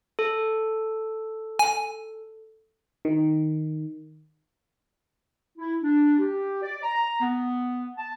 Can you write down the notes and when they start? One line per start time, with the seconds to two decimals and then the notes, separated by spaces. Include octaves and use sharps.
0.19 A4
1.59 G#5
3.05 D#3
5.58 E4
5.82 D4
6.19 G4
6.63 D5
6.83 A#5
7.21 B3
7.98 A5